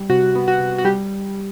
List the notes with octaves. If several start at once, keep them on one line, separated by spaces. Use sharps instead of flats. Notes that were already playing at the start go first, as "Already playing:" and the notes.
Already playing: G3
C3 F#4
B3
F#4
C3
F#4
G3 G4